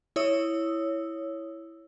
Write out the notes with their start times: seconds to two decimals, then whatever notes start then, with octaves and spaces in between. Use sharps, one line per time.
0.16 E4 C#5 D#6 E6